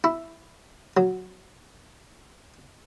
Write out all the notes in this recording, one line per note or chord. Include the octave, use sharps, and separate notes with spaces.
E4
F#3